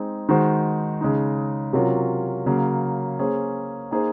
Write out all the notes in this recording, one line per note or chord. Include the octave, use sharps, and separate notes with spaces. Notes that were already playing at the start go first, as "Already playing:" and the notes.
Already playing: G#3 C4 D#4 G#4
D#3 G#3 D#4 F#4 C5
C#3 G#3 D#4
C3 F#3 C#4 F4 A#4
C#3 F#3 A#3
A#3 C#4 G#4 C5
A#3 D#4 G#4 C5